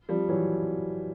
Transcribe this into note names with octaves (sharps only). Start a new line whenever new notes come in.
F3 G3
E3 F#3